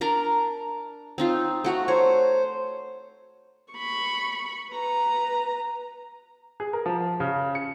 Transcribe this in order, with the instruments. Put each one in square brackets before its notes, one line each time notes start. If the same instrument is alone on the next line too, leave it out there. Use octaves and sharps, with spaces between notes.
[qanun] D4 A#4 A#5
C4 D#4 F4
A3 F#4 A#5
[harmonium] C5 [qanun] C#5
[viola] B5 C#6
B4 A#5
[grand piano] G#4
A#4
F3
C#3
C#7